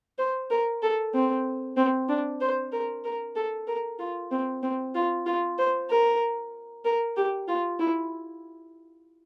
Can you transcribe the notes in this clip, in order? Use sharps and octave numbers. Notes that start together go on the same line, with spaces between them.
C5
A#4
A4
C4
C4
D4
C5
A#4
A#4
A4
A#4
F4
C4
C4
F4
F4
C5
A#4
A#4
G4
F4
E4